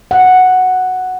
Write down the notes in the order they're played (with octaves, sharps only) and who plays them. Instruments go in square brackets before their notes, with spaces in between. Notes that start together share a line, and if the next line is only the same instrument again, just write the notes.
[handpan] F#5